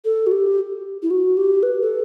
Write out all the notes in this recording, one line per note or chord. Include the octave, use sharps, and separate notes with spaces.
A4
F#4
G4
E4
F#4
G4
B4
A4